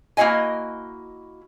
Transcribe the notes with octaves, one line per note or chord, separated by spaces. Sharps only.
A#3 E4 F#4 D#5 G#5